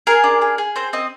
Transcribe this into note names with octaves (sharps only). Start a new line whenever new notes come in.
G#4 A#4
D4
G#4
G#4
C4 C5
C4 D#5